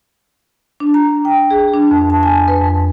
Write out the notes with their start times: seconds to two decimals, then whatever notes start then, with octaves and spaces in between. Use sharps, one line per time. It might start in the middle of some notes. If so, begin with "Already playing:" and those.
0.80 D4
0.94 A#5
1.25 G5
1.51 G#4
1.74 D4
1.91 F2
2.10 A5
2.23 G#5
2.48 B4
2.61 F2